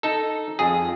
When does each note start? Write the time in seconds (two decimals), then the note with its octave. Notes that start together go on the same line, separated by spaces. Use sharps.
0.03 D#4 A4
0.59 F2 G#4